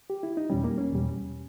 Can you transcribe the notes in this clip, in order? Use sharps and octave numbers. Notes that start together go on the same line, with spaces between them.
G4
E4
D#4
E2 B2 G3 C#4
A#3
C#4
E2 B2 G3